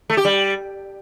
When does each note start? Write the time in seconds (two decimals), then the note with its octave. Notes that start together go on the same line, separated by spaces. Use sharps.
0.10 A3
0.17 G4
0.25 G3